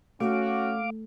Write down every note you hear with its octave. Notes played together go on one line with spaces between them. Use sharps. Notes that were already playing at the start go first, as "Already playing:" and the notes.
A3 C#4 F#4 F5 D6